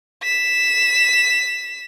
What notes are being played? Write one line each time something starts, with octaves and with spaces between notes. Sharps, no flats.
B6 E7